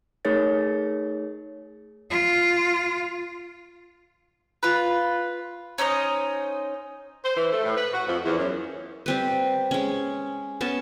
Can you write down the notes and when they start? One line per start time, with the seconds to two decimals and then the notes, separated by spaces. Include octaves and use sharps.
0.25 A3 D#4 G#4 A#4 C#5 A6
2.11 F4
4.63 F4 B4
5.78 C#4 D#4 C5 D#5
7.24 C5
7.37 E3
7.52 A3
7.65 A2
7.77 B4
7.94 F#4
8.08 F2
8.24 E2
8.39 F#2
9.06 G3 C4 B4
9.71 G#3 C#4
10.61 B3 C#4 A5